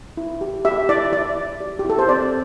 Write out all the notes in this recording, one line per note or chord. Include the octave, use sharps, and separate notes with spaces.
E4
G4
G4 E5
E4 D5
E4 D5
E4
G4
G4
E4 A4
C5
C4 D5